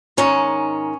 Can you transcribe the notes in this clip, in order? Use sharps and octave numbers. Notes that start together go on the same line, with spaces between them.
G#2 D#3 C#4